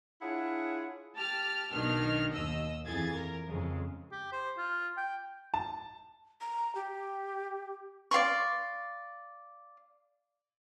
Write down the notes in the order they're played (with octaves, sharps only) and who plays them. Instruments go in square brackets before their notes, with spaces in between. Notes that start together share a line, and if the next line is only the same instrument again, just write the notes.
[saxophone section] D4 E4 F4 G#4 C#5 F#5
[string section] G4 A5 F6
B1 B2 D#3 D4 F6
D#2 D#5 E6
F2 E3 G#4 G#6 A6
A#4
F2 C#3 G#3
[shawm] G4
C5
F4
G5
[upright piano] A5
[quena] A#5
G4
[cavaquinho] D5 F5 C6 C#6